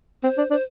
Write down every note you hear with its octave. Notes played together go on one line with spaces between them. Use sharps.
C4 C5
D4
D4 C5